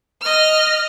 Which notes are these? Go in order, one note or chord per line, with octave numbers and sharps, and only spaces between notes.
D#5 F6